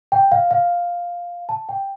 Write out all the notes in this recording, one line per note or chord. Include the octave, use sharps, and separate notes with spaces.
G5
F5
F5
A5
G5